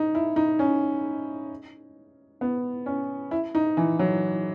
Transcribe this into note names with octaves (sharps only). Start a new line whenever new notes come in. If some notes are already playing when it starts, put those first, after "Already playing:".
Already playing: D#4
E4
D#4
C#4
B3
C#4
E4
D#4
E3
F#3